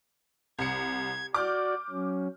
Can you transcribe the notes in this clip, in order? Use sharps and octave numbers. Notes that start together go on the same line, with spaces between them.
C2 G#6 C#7
F#4 D5 D6 F6 G6
F#3 C#4